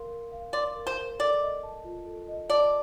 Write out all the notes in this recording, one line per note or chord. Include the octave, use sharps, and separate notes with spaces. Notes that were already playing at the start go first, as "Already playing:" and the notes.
Already playing: A#4 F5 C6
A#4
F5
D5 C6
A#4
C5
A#4
A4 D5
D#5
A5
F4
A4
D#5
D5 A5